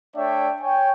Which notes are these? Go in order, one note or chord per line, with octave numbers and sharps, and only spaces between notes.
A3 D4 C#5 D5 E5 G5
C#5 G5 G#5